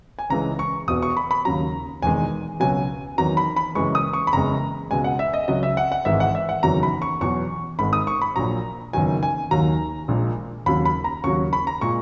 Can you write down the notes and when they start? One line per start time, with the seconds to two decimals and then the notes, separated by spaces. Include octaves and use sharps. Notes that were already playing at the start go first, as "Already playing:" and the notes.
0.19 G#5
0.30 C#2 C#3 E3 G#3 A#5
0.59 C#6
0.88 E1 E2 B2 D#6
1.02 C#6
1.17 B5
1.31 B5
1.45 D#2 C#3 F#3 A#5
2.02 E1 E2 D#3 G#3 G#5
2.60 C#2 B2 F#3 G#5
3.18 E2 D#3 F#3 A#5
3.37 B5
3.56 B5
3.75 F#1 F#2 E3 G#3 C#6
3.95 D#6
4.13 C#6
4.27 B5
4.33 F#1 E2 C#3 G#3 A#5
4.91 C#2 B2 G#3 G#5
5.04 F#5
5.19 E5
5.34 D#5
5.48 C#2 C#3 F#3 D#5
5.63 E5
5.77 F#5
5.92 F#5
6.05 G#1 G#2 E3 G#3 E5
6.20 F#5
6.35 E5
6.49 F#5
6.63 F#1 E2 D#3 F#3 A#5
6.83 B5
7.02 C#6
7.21 E2 B2 F#3 C#6
7.79 G#1 G#2 D#3 G#3 B5
7.93 D#6
8.07 C#6
8.22 B5
8.36 A#1 A#2 F#3 A#5
8.93 F#1 E2 D#3 F#3 G#5
9.23 G#5
9.51 D#2 D#3 F#3 A#5
10.08 A#1 A#2 G#3
10.66 D#2 C#3 F#3 B5
10.85 B5
11.04 A#5
11.24 D#2 C#3 F#3 C#6
11.53 B5
11.67 A#5
11.81 A#2 G#3 C#6